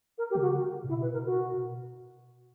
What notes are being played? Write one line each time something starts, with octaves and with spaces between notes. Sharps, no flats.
A#4
G4
C#3
F#4
A#2
B2 E4
B4
A#4
F#4